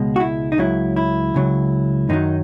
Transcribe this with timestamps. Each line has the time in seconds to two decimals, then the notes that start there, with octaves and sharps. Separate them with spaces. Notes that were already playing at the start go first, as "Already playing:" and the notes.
Already playing: C#2 B2 G#3
0.16 F#4
0.20 E4
0.52 D#4
0.58 C#2 C#3 F#3 E4
0.96 E4
1.34 C#2 C#3 F#3
2.09 F#2 D#3 F#3 D#4